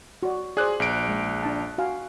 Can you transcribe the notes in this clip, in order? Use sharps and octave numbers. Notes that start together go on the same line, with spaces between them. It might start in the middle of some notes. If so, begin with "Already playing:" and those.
F#4 D5
G#4 C5 D5 F#6
A#1 D7
G#3
D4 A5
F#4 F5 G#5